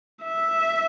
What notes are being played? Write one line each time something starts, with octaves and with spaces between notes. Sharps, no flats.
E5